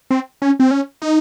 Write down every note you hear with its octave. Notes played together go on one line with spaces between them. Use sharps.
C4
C#4
C4
C#4
D#4